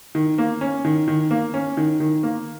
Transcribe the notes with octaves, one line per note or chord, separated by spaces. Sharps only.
D#3
A#3
C#4
D#3
D#3
A#3
C#4
D#3
D#3
A#3